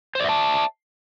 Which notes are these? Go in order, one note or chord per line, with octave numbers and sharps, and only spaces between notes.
C5 D5 E5 A5